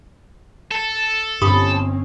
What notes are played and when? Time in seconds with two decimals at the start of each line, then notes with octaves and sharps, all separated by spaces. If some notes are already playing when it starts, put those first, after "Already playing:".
0.71 A4
1.42 G1 G2 C4 C#4 G4 B5 D#6